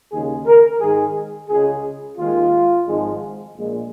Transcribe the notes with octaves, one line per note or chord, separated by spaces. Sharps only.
D#2 C#3 G#3 G#4
A#4
G#2 D#3 G#3 G#4
C#2 C#3 G#3 G#4
D#2 D#3 G#3 F4
G#1 G#2 F3 G#3
A#1 A#2 G#3